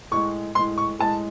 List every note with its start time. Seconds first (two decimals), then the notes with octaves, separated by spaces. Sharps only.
0.12 A2 G#3 C#6
0.55 A2 G#3 C6
0.78 C#6
0.99 A2 G#3 A5